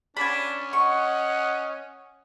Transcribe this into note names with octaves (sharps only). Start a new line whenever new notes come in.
C#4 D4 G#5 B5
D#5 F#5 C#6